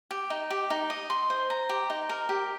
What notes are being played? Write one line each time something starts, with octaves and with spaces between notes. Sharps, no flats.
G4
D#4
G4
D#4
D#5
C6
C5
A#5
G4
D#4
A#4
G4